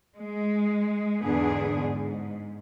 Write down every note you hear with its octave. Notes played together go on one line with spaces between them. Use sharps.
G#3
E2 G#2 D3 B3 D4 G#4
G#2